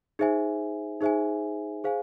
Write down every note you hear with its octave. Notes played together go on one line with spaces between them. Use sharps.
D#4 G#4 C5 E5 G#5
D#4 G#4 C5 E5 G#5
G#4 C5 F5 G#5